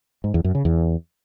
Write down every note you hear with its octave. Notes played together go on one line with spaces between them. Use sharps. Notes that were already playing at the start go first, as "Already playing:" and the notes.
G#2
E2
F#2
C#3
E2